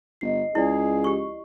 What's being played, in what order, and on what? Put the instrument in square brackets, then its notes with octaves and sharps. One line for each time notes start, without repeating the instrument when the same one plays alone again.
[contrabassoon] G1 [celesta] D#5 C7
[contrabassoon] C#2 [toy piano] E4 D5 [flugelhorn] G#4
[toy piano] G4 C#6